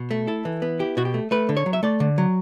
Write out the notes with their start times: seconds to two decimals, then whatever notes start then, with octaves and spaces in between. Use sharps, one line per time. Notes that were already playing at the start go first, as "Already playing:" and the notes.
Already playing: B2
0.11 A3
0.27 E4 A4
0.45 E3
0.62 B3
0.79 E4 G4
0.97 B2 F#4
1.05 G4
1.14 A3
1.31 A3 B4
1.49 D3
1.57 C#5
1.66 F#3
1.73 E5
1.83 A3 D5
2.00 D3
2.18 F#3